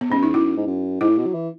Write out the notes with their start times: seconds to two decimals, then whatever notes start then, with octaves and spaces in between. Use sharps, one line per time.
0.01 B3
0.09 G#2 C#4
0.17 F#2
0.23 E2 D#4
0.34 F#2 E4
0.57 G#2
0.67 F#2
1.01 G#2 E4
1.09 A2
1.17 B2
1.26 F#3
1.34 E3